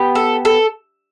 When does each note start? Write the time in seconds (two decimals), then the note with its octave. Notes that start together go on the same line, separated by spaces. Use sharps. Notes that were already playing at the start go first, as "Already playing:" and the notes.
Already playing: B3 G4
0.15 A4
0.45 A4